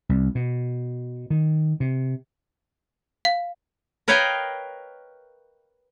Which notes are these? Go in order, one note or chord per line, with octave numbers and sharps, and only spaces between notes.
C2
B2
D#3
C3
F5
A#4 B4 C#5 D#5 F5 G5